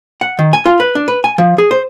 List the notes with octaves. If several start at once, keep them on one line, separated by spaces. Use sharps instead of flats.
F#5
D#3
G#5
F4
B4
D4
B4
G#5
F3
G#4
C5